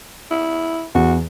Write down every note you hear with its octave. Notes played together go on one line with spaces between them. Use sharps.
E4
E2 F#4